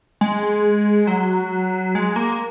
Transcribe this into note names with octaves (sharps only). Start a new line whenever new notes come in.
G#3
F#3
G#3
A#3